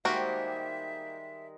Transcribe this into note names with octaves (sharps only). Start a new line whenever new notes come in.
D#3 G3 G#3 A#3 F#4 G4 C5 E5